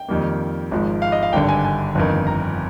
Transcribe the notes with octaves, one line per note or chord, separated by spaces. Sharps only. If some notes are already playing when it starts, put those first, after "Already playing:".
Already playing: G5
F2 D#3 G3 A#3
G#1 G#2 F3
F5
D#5
F5
G#1 G2 D3 G5
G#5
G#5
G1 F2 D#3
A#5